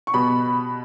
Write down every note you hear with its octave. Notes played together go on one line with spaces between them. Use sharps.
C#6
B2 G3 B3 B5